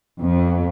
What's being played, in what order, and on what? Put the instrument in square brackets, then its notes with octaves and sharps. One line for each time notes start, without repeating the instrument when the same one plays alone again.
[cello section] F2